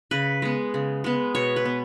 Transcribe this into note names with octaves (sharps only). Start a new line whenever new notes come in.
C#3 B4
G#3 B3
C#3
G#3 B3
B2 C#5
B4
B3